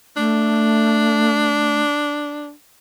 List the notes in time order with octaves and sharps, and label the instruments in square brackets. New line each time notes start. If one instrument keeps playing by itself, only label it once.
[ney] A3 [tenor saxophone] D4